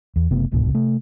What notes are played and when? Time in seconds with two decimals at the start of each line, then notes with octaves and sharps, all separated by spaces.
0.16 E2
0.30 F#1 C3 A3 B3
0.51 D1 C2 G#2 B2
0.70 C3 A3